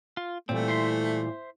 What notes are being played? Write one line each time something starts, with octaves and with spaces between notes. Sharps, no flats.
F4
A#2 E3 G3 A3 C4
C5 E5 C6